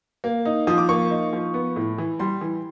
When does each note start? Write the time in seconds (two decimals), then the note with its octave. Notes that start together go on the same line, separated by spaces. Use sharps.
0.24 A#3
0.45 D#4
0.67 F3 D#6
0.78 D6
0.89 A#3 C#6
1.10 D#4
1.33 F3
1.54 B3
1.76 A2
1.98 E3
2.20 G3 C6
2.41 E3